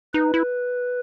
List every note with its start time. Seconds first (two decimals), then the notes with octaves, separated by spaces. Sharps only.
0.14 D#4 B4
0.34 E4